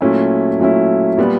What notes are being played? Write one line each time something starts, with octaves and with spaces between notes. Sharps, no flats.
A#2 F#3 A3 C#4 E4
A#2 F#3 A3 C#4 E4
A#2 G3 B3